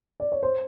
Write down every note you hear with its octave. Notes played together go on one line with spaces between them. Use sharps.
D5
C#5
C5